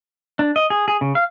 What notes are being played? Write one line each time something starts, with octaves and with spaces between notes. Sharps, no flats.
D4
D#5
G#4
G#4
C#3
F5